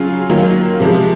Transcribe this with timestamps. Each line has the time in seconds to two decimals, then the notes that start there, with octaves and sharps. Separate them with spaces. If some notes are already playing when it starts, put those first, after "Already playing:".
Already playing: C#3 F#3 C#4 F4 G#4
0.30 D#3 F#3 A#3 F4
0.80 C3 F3 G#3